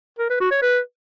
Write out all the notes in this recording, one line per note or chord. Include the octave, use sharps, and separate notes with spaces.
A#4
B4
F#4
C#5
B4